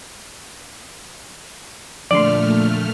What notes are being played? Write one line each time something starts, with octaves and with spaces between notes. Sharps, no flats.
F2 A#2 D3 A3 D5 C6 F6